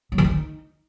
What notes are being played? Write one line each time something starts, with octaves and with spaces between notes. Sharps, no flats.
F#3
D#3
D#4